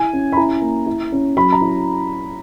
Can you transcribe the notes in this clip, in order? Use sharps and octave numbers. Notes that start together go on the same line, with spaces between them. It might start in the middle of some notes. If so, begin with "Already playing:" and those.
Already playing: E4 G#5
C#4
B5
E4 A#5
A#3
E4
C#4
F#3 B5
A#5
E4